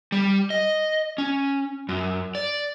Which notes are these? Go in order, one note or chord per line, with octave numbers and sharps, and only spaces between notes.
G3
D#5
C#4
F#2
D5